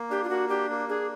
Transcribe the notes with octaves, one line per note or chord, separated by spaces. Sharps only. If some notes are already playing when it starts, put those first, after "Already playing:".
Already playing: A#3
D4 G4
F4
A#3 F#4
D4 G4
A#3
D4 G#4